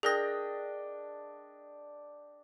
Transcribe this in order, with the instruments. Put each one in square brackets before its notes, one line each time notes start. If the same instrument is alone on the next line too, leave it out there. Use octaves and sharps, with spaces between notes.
[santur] D4 D#5 G5 [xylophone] G#4 A#4 A#6